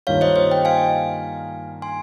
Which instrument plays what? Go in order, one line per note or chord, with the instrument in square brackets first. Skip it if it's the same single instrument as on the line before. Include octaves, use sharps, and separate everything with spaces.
[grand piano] G2 D#3 A#3 F4 [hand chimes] C#5 F5
[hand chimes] C5 D#5
C5 D#5
D#5 G5
F5 G#5
G#5 C6